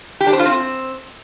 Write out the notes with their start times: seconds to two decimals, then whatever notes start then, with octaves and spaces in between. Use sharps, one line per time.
0.21 G4
0.27 D4
0.33 C5
0.39 F4
0.46 C4